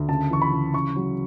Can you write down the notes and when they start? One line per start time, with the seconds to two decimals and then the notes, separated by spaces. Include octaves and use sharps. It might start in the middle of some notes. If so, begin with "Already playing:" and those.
Already playing: D2
0.09 C#3 A5
0.30 E3 C#6
0.42 B5
0.52 C#3
0.74 C#3 C#6
0.96 F#3